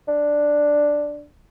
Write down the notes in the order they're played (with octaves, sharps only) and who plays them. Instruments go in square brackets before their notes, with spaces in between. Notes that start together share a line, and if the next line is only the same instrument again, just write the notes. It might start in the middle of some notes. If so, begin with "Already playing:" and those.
[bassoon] D4